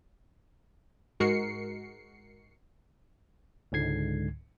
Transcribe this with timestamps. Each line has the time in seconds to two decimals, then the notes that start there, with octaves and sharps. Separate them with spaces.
1.20 G#2 G#3 F#4 A#4 C7 C#7
3.72 C#2 G#2 D3 G#6 C7